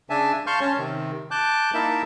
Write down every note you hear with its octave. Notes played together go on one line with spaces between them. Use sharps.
C#3 D4 E5 G#5 A5
F5 A5 C6 C#6 F6 G6
C#4 C#5 A5
C3 D#3
A5 D6 F#6 G6
A#3 D#4 E4 A#4 E5 A5